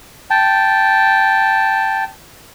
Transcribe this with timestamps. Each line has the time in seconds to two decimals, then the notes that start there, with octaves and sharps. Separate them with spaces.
0.30 G5 A5